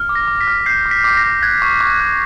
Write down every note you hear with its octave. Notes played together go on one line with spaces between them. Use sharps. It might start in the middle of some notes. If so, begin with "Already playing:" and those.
Already playing: F6
D6
A#6
D6
B6
F6
G6 C7
D6
B6
D6
A#6
G6
F#6 G#6
C#6
C#6
F#6